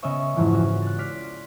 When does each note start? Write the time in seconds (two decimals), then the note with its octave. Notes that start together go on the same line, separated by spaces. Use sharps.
0.02 C#3 B3 C#4 D#5 E5 C#6
0.37 F2 G#2 C#3 E3
0.51 C#4 F#4
0.82 F#6 A6
0.98 D5 C6 F6 B6 D7